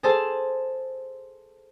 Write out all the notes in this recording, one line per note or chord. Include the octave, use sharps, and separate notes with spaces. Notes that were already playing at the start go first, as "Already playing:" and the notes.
G#4 A4 C5 A5